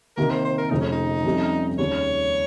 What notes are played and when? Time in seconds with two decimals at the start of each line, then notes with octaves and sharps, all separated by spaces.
0.17 C3 D#3 A#3 A#4
0.30 C5
0.45 C5
0.58 A#4
0.71 F1 F2 C#3 D#4
0.81 C#4
0.92 D#4
1.24 F2 C3 G3 C#4
1.78 D#2 C#3 G3 C#5